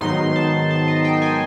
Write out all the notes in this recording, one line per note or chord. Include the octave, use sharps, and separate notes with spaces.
G#2 D#3 F#3 B3 D#4 C6
A5
A5
D#5
G5
G#5